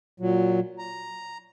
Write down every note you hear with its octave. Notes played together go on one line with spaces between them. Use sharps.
A#2 F#3
A#5